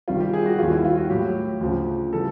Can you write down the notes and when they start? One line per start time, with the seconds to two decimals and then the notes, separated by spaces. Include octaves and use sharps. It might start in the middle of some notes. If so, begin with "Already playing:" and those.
0.08 C2 C3 D#3 G3 F4
0.20 G4
0.33 G#4
0.46 F#4
0.59 D#2 D#3 G3 F4
0.71 E4
0.85 F4
0.97 F#4
1.09 A2 F#3 G4
1.61 D2 C#3 F3
2.12 C#3 E3 G3 A4